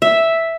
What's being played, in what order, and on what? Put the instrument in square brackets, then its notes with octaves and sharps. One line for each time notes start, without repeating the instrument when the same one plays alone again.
[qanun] E5